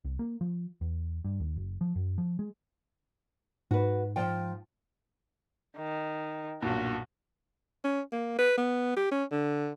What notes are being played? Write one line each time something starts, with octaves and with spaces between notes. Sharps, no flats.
C2
A#3
F3
E2
G2
D#2
F#1
F3
F#2
F3
G#3
G#2 F#4 B4
F3 G5
D#3
B1 G2 A#2 F#4
C#4
A#3
B4
B3
G4
C#4
D3